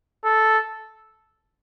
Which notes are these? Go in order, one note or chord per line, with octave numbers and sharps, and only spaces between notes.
A4